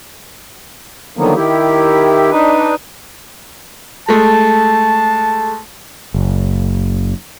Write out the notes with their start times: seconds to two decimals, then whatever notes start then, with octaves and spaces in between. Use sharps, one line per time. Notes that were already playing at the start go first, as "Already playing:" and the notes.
1.17 D3 D#3 F3 F#3 A#3 B3
1.36 D#3 E4 G4
2.31 D4 D#4 B4
4.09 G#3 A3 A5
6.14 F#1